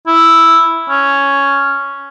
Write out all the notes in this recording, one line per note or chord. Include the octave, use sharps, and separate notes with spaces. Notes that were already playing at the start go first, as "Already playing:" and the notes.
E4
C#4